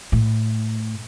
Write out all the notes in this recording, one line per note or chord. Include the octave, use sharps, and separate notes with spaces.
A2